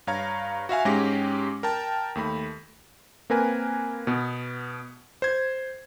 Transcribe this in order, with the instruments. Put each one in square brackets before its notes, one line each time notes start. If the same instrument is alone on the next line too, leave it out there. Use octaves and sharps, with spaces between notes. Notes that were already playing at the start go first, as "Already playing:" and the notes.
[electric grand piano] G2 C#5 F5 A#5 G#6
F#4 E5 F5 G#5
G#2 G#3 C#4 G4 A#6
A#4 G5 A5
D#2 A3 B5
A#3 C4 A#4 B4 G#5
B2 B3
C5 G#6